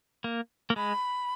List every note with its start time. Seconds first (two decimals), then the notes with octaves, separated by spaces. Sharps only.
0.24 A#3
0.70 A#3
0.76 G#3 B5